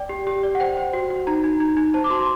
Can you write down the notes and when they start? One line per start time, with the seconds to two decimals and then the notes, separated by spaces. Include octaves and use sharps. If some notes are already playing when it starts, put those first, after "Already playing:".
Already playing: D5 G5
0.09 G4
0.27 G4
0.43 D5
0.55 F#5
0.60 C5 G5
0.77 C5
0.93 F#4
1.10 F#4
1.27 D#4 A#5
1.44 D#4
1.60 D#4
1.77 D#4
1.94 C5 A5
2.04 D6
2.10 F#4 C6